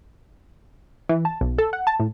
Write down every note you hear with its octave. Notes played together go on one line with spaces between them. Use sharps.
E3
A5
B1
A4
F#5
A5
A2